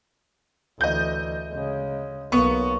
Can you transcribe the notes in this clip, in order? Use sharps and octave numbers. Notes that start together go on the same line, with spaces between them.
D2 E3 D#5 G6
C#3 G#3
B1 A#3 B3 C#6